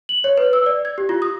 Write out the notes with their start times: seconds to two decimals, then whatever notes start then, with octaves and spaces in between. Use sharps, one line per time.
0.09 F#7
0.24 C#5
0.38 B4
0.53 E6
0.66 D5
0.85 G#6
0.98 G4
1.09 F4
1.22 D#6